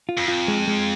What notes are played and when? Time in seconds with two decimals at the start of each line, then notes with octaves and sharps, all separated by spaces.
0.09 F4
0.18 F2
0.28 F4
0.48 G#3
0.67 G#3